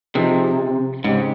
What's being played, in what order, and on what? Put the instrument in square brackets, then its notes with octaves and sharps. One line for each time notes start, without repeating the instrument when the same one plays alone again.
[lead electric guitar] C3 [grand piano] F3 C4 D#4 G#4
[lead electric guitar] G#2 [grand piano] C#3 G#3 C4 D#4 G4